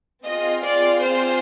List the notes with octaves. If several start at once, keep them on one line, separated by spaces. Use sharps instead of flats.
C4 F4 G#4 D#5
D5
C5